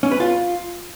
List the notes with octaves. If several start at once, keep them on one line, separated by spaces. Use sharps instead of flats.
C#4
B4
F4